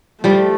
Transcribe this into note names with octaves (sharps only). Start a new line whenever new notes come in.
F3 G3 A3